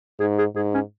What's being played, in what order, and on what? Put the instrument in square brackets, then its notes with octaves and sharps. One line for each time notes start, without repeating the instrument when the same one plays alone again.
[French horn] G#2 [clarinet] G#4
[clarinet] G#4
[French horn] G#2 [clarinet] G#4
[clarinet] C#4